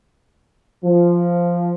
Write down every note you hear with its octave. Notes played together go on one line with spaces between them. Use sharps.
F3